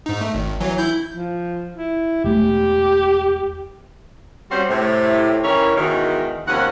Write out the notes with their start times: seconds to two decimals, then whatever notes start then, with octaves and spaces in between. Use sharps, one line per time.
0.06 G#2 D#4
0.21 A3
0.34 G#1
0.61 E3 F#3
0.78 E4 G6
1.12 F3
1.76 E4
2.24 E1 A3 G4
4.52 G3 C4 C#4 F#4 C5
4.70 A2 C3
5.44 D#3 E3 C#4 E4 A#4 C#5
5.76 E2 G#2 B2 D#3
6.47 D#2 C3 F3 C#4 F#5